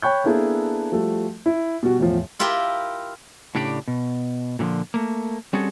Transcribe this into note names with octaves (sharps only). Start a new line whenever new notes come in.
C#5 G5 B5 C#6 F#6 G6
A#3 B3 D4 E4 G#4 A4
F3 G3 A3 F#4 A4
E4
B2 G3 F#4
E2 A2 F3
E4 F4 G4 A#4 E5
A2 C#3 D4 G4 D5 G5
B2
A#2 D3 E3 F3
A3 A#3
G3 C4 C#4 F#4 G#4 A4